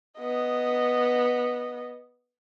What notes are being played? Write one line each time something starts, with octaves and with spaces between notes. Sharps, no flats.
B3 D#5